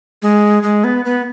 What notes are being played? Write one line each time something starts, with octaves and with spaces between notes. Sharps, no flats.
G#3
G#3
B3
B3